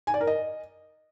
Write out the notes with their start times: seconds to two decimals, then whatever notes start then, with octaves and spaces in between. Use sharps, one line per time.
0.07 G#5
0.14 D5
0.21 A#4
0.27 D#5